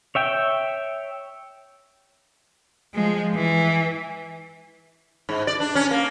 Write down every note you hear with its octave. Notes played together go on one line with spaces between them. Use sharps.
C#5 E5 G5
F3 G#3
E3
G#2
D5
D4
C#4
A#3